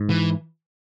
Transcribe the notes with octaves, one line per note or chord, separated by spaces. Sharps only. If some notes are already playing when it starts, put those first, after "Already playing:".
Already playing: G#2
E3